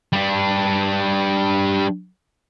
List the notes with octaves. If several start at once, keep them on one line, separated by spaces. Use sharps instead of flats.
G3 D4